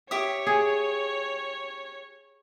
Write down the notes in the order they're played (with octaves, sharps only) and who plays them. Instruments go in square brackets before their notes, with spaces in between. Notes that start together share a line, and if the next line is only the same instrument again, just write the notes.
[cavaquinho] G4 E5 D#6 [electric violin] C#5
[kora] G#4